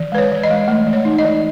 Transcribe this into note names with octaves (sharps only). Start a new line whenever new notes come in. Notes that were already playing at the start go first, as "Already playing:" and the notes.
Already playing: E3
G#3 B4
C#5
E3
D#5
G#3
A3
E3
C#5
D#4
D#5
E3